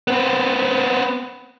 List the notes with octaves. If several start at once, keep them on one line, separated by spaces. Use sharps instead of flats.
B3 C4